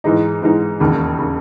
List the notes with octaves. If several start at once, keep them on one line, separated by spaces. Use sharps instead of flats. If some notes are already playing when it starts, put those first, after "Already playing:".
G#2 E3 G#3 D#4
G#2 E3 G#3 D#4
E1 D#2 C#3
C#3